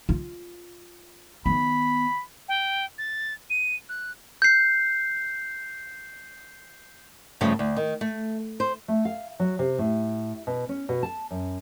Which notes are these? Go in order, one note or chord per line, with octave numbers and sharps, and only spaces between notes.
F4
D#3 B3 B5
G5
A6
D#7
F#6
G6 C7
G2 C#3 F3 A3
D2
D#3
A3
C5
A3
F5
F#3
C3
A2
B2
C#4
B2
A5
F#2